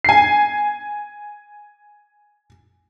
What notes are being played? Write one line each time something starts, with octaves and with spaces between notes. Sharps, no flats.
G#5 C7